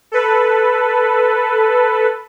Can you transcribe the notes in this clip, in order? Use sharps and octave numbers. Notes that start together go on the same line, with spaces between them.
A4 B4